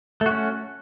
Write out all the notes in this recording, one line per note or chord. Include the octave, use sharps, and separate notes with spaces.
A3 C#4 F#4